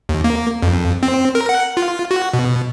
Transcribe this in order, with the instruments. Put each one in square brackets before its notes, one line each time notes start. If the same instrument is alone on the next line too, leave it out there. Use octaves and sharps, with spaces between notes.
[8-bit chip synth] D#2
A#3
F2
C4
A#4
F#5
F4
F#4
B2